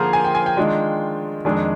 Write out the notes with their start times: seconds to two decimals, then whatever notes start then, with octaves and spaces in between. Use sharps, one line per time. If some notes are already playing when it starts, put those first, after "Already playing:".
Already playing: D3 F3 A#3 F4 G#4 A#4 C5
0.13 G#5
0.25 G5
0.35 G#5
0.46 G5
0.57 D#3 G#3 D4 F4
1.45 F2 D#3 G#3 D4 G#5